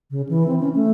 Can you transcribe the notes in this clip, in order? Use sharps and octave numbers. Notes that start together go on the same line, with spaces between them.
C#3
E3
C4
C#4
A3